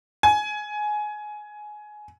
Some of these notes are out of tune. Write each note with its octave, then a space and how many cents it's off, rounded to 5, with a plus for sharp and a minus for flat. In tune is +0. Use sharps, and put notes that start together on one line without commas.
G#5 +15